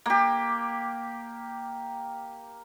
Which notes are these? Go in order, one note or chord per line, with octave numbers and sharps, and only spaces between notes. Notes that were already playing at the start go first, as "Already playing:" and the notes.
A#3 G4